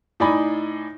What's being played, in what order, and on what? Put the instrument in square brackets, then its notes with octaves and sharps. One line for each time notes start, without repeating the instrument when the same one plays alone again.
[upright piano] A2 D#4 D5 G#5 B5